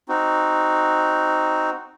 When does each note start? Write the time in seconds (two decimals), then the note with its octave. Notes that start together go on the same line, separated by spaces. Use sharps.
0.09 C4 D#4 F#4